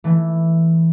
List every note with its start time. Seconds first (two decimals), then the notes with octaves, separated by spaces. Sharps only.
0.04 E3 A3